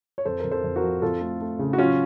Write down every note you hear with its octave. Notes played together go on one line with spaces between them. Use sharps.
C#5
F2 A4 C5
F2 A#4
A4 C5
F2
F#4 A#4
F3
F2 F4 A4
A3
A3
C#3
F#4
F#3 C#4 F4